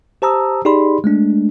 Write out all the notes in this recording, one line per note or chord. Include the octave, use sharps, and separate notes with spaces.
G4 C5 A5 A#5 D#6 E6
D#4 G4 G#4 D5 B5 C6
G#3 A3 D4